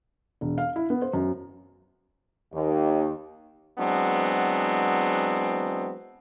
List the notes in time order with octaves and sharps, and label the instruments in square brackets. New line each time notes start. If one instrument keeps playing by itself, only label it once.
[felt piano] E1
F5
E4
B3
C5
F#2
[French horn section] D#2
[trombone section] E3 F#3 G#3 B3 C4 D4